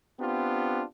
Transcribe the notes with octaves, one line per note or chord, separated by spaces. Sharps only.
B3 C4 D4 F4 G4